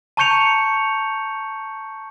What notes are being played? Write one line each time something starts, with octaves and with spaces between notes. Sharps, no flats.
A5 A#5 C#6 G6 C#7 F7